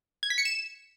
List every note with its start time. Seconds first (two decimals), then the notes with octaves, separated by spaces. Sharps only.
0.23 G#6
0.30 B6
0.38 C#7
0.45 E7